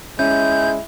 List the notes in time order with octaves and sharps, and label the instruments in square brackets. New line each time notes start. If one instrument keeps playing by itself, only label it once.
[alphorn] G#3 [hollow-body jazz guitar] C#4 [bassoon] E4 [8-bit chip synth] G6